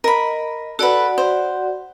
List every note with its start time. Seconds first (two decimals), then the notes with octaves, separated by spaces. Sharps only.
0.04 A#4 D#5 B5
0.79 F#4 A4 B4 D5 F#5
1.18 C5